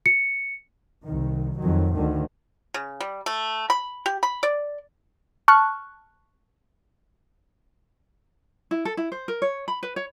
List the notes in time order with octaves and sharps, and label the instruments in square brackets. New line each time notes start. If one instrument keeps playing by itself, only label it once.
[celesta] C#7
[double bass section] C2 D#3
F2 D#3 F#3
D2 D3 D#3
[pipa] C#3
G3
A3
B5
G4
B5
D5
[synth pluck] A5 C#6 F6 F#6
[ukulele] E4
A4
E4
C5
A#4
C#5
B5
B4
C#5